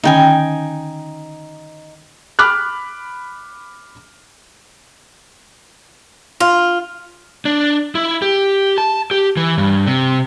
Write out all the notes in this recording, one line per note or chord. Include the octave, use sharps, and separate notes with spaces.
D3 D#3 C#4 D#4 G5 G#5
B5 D6 F6 F#6
F4
D4
E4
G4
A5
G4
E3
G2
C3